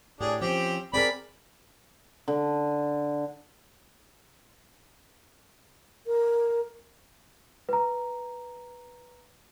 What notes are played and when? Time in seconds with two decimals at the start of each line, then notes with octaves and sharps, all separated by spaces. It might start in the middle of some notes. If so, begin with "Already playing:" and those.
0.21 A2 D4 G4 G#4
0.41 F3 C4 C#4 G4
0.94 C4 G#4 A#4 D5 B5
2.28 D3
6.07 A#4
7.69 B4 A#5